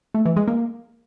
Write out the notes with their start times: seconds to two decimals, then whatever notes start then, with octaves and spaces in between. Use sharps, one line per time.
0.14 A3
0.25 E3
0.37 G#3
0.48 A#3